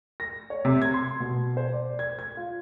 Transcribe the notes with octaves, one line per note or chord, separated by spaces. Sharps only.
A#6
C#5
C3
G#6
C6
B2
C5
D5
G#6
G#6
F4